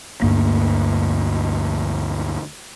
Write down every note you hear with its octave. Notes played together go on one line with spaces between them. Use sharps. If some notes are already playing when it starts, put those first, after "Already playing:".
D2 G2 A#3